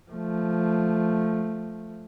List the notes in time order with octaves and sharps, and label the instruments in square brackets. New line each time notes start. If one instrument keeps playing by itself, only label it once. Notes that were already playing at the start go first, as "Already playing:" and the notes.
[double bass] F3 A3